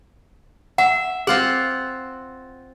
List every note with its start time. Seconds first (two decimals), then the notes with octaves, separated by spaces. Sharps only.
0.78 E5 F#5
1.27 C4 F4 G#4 F#5